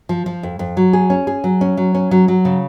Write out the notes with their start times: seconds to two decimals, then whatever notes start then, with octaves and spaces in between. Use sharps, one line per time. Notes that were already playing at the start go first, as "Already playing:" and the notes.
0.09 F3
0.26 F3
0.43 F2
0.59 F2
0.77 F#3
0.93 G#4
1.10 C#4
1.27 G#4
1.44 F#3
1.61 C#4
1.77 F#3
1.95 C#4
2.11 F#3
2.28 F#3
2.45 C#3